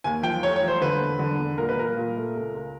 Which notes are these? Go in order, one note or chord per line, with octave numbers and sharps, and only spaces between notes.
D#2 G#5
F3 G5
F1 C#5
C#5
F3
C5
D3 B4
E1
D3
E1
A#2 A#4
B4
A#2 A#4
A#2
A3
C#2
C#2